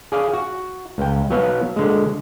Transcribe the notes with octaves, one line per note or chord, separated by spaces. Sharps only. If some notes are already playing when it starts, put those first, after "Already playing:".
G#4 D5 F5
F#4
C#2 G5
F#3 B3 F5
D3 G#3